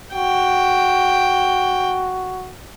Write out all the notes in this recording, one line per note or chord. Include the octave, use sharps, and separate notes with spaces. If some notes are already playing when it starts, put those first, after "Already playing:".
F#4 G5